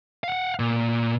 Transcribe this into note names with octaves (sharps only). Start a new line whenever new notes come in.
F5 F#5
A#2